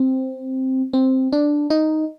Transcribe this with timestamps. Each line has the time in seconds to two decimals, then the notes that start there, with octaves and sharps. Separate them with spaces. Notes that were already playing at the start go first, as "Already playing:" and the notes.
Already playing: C4
0.93 C4
1.32 D4
1.70 D#4